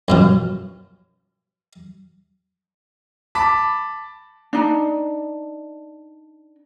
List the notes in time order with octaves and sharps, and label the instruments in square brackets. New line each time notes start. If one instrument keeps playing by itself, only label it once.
[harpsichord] F#2 B2 F3
[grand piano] A5 B5 D6 B6
[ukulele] D4 D#4